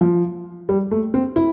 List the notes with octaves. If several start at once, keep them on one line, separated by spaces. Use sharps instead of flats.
F3
G3
A3
C4
E4